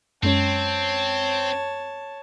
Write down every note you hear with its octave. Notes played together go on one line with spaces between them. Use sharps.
F#2 G#3 C4 C#4 C#5 A5